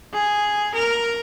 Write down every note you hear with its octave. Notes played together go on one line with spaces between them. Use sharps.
G#4
A#4